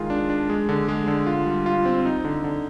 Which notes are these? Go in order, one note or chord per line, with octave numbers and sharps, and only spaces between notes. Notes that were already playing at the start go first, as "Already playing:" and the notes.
Already playing: D#3 G#3 F4
D4
D4
G#3
D3
G#3
D3
F4
G3
F4
C4
D#4
D3
D3